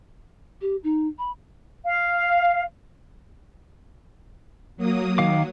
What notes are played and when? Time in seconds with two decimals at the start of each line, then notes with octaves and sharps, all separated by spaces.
0.61 G4
0.84 D#4
1.18 B5
1.85 F5
4.77 F#3 A#3 D#6
5.18 D#3 F#3 F5 D6